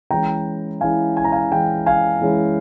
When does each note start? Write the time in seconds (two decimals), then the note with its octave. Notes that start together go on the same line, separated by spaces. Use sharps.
0.11 E3 G#3 C#4 E4 G5 A#5
0.81 E3 G#3 C#4 E4 F5 G#5
1.17 G#5
1.24 A#5
1.32 F5 G#5
1.51 E3 G#3 C#4 E4 G5
1.86 F5 G#5
2.21 E3 G#3 C#4 E4